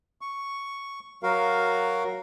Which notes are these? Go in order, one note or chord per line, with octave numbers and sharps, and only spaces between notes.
C#6
F#3 F#4 A#4 F5